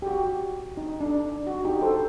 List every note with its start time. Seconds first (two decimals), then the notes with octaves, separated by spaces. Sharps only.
0.02 G4
0.07 F#4
0.77 D#4
1.01 D4
1.47 F#4
1.65 D#4 G4
1.82 A4 C5